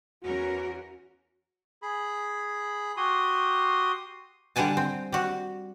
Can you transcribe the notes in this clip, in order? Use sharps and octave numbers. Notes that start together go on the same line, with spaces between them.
E2 C#4 F#4 A#4
G#4 B5
F#4 G4 C6 D#6
D3 G3 D4 F#5 G#5 A5
C4
G3 F#4